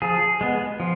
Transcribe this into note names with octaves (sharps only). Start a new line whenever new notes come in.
F3 G#4
G#3 B3
F3